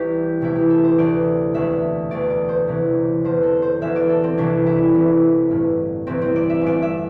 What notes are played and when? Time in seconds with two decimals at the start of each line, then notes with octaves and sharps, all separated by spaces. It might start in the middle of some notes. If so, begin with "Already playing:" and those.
Already playing: C2 C3 E3 G4
0.41 E1 D2 C3 E3 E4
0.55 G4
0.70 A4
0.84 C5
0.98 D2 C3 E3 D5
1.54 E1 D2 D3 E5
2.11 E1 D2 D3 D5
2.30 D5
2.49 C5
2.67 C2 C3 E3
3.24 E1 E2 D3 C5
3.43 A4
3.62 C5
3.81 E1 E2 E3 E5
3.96 D5
4.09 A4
4.24 C4
4.37 C2 C3 E3 D4
4.66 E4
4.94 C2 C3 E3
5.50 A1 G2 D3
6.07 C2 C3 E3 C4
6.22 C4
6.36 D5
6.50 E5
6.61 G1 G2 D3 D5
6.82 E5